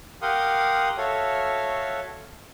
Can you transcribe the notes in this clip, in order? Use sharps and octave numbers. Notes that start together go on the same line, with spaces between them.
G4 A#4 F5 F#5 C6 D#6
F#4 A4 C#5 E5 F5